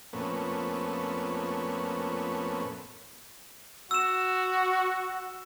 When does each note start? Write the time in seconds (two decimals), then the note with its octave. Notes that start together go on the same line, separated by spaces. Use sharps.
0.13 F2 A#2 A3 B3 C#4
3.91 F#4 E6 E7